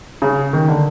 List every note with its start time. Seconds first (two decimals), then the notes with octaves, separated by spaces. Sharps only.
0.22 C#3
0.53 D#3
0.68 D3